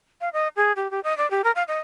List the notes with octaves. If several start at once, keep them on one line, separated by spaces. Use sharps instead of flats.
F5
D#5
G#4
G4
G4
D#5
D5
G4
A#4
F5
D#5